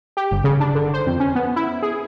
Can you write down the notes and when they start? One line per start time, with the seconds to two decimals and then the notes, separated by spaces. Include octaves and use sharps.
0.17 G4
0.31 G1
0.44 C#3
0.60 D4
0.75 D3
0.94 C5
1.07 F2
1.20 C#4
1.35 B3
1.56 E4
1.83 G#4